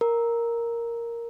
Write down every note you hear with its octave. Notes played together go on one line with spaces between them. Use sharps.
A#4